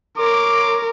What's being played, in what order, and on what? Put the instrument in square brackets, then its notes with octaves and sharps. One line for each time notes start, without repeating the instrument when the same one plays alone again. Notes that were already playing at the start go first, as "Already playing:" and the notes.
[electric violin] A#4 [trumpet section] C#5 C6 D6